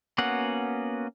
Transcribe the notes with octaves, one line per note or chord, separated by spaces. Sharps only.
A#3 B3 C#4 F#4 F#5